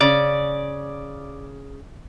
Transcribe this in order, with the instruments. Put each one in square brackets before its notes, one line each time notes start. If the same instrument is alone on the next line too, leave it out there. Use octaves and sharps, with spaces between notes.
[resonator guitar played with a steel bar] C#3 [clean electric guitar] D5